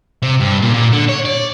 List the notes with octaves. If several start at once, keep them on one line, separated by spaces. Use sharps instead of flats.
C3
G2
A#2
A#2
D3
C#5
D5